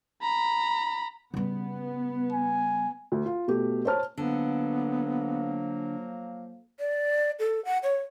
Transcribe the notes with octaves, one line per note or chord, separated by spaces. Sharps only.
A#5 B5
C#3 G3 B3
G#5
D2
F4
B2 A3 G4
C5 C#5 A5 F6
D3 F3 F#3 A#3 B3
D5
A4
F#5
C#5